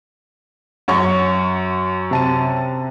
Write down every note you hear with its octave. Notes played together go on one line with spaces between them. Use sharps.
F#2 C#5 C#6
C3 A5 D#7